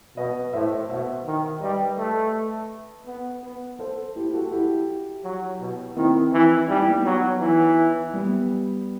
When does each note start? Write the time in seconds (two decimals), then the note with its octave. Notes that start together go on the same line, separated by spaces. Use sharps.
0.17 B2 B4 D#5
0.53 A2 C5 E5
0.89 B2 C5 E5
1.26 D#3
1.61 G3 B4 D#5
1.98 A3
3.07 B3
3.43 B3
3.79 A4 C5
4.16 E4 G4
4.33 F#4 A4
4.51 E4 G4
5.24 F#3
5.60 B2
5.96 D#3 C4 E4
6.33 E3
6.68 G3 D#4
6.79 E4
6.88 B3 D#4
7.05 F#3
7.41 E3
8.13 G3 B3